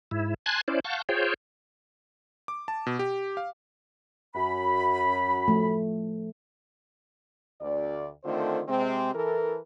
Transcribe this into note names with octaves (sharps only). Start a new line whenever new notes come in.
G#2 E4
G#5 A5 C6 F#6 G#6
C#4 E4 C5 D5
F5 F#5 A5 C#6 G6
F4 G#4 C5 C#5 G5
D6
A5
B2
G4
F5
F#2 B5
F3 A3
D2 D5
D3 D#3 A3 C4 F4 C5
C3 G#3 C4
E3 A4 A#4